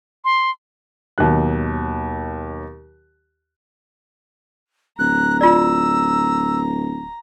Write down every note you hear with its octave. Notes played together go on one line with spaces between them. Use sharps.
C6
D#2 B2 F#3 F#6
D1 A#5 F#6
F4 D5 E6